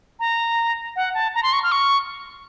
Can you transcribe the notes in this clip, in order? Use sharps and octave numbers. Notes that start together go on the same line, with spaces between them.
A#5
F#5
A5
A#5
C6
C#6
F6
C#6